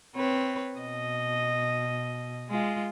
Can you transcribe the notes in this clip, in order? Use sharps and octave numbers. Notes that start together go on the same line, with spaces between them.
C4 B4 C#5
B2 D#5
G#3 F4